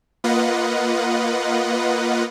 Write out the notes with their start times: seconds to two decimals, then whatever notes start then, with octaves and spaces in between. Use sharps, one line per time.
0.24 A#3 F4 B4 D#5 F#5